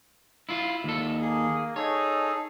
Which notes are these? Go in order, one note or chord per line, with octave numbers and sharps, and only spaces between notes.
E4 F4
D#2 A4
A#3 G#4
D#4 G#4 A4 C#5